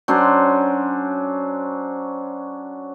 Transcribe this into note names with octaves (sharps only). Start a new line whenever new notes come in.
F#3 C#4 D4 C5